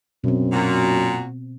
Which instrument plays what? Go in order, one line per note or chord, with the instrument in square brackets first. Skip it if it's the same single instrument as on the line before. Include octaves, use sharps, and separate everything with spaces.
[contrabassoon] F#2 [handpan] B2 C4
[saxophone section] A#2 F#4